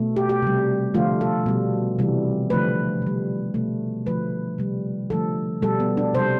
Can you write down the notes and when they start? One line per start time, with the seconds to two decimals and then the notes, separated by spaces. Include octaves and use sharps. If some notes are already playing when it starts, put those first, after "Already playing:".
Already playing: B2 A3
0.16 G4
0.29 G4
0.42 C3 G3
0.94 D3 F3 A3 F4
1.21 A4
1.46 B2 G3
1.99 C3 E3 G3
2.50 D3 F3 A3 B4
3.02 C3 G3
3.54 B2 A3
4.06 D3 F3 A3 B4
4.58 C3 G3
5.10 D3 F3 A3 A4
5.62 B2 G3 A4
5.80 B3
5.97 D4
6.14 C3 G3 C5